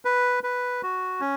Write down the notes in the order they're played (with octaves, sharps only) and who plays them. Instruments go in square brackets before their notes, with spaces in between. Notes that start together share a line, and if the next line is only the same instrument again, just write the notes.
[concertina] B4
B4
F#4
C#4